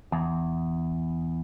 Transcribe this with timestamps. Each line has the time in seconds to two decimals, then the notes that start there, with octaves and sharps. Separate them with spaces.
0.12 E2